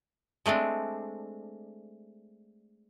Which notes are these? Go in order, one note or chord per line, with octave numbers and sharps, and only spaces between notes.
G#3 A3 C4 D4